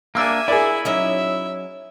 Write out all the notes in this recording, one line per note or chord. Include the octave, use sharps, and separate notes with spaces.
A#3 D4 E5 G#5 D6 E6
E4 G#4 A#4 D5
F#3 C#4 D#4 E5